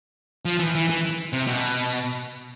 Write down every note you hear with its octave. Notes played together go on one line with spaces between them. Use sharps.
F3
E3
E3
E3
C3
B2